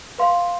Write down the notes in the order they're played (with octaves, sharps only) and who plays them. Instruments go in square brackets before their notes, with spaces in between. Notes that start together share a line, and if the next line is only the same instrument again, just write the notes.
[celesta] B4 F5 C6